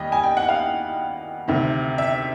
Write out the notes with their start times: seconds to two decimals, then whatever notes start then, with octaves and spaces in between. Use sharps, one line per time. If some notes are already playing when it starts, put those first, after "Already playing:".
Already playing: D#2 G3 D#5
0.12 G#5
0.23 G5
0.37 F#5
0.49 F5
1.48 D2 C3 D#3
1.98 E5